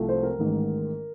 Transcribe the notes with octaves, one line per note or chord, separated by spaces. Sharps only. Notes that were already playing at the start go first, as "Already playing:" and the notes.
Already playing: C2 C3 F3 A3
C5
A#4
A1 G#2 D#3